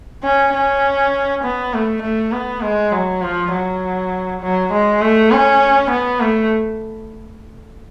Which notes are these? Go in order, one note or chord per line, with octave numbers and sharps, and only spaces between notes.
C#4
C#4
B3
A3
A3
B3
G#3
F#3
F3
F#3
F#3
G#3
A3
C#4
B3
A3